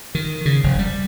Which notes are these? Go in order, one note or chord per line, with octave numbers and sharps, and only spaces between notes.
D#3
C#3
F1
G3